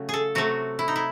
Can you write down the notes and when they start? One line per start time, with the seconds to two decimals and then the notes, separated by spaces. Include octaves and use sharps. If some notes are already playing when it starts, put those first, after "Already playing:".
Already playing: C#3 F#3 A3
0.09 G#4 A4
0.35 C3 F#3 A3 F#4
0.79 E4
0.88 D#4
0.96 E4